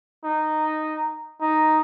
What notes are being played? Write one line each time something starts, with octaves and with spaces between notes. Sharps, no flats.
D#4
D#4